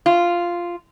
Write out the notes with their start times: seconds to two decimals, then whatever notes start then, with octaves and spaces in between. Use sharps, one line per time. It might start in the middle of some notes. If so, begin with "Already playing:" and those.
0.06 F4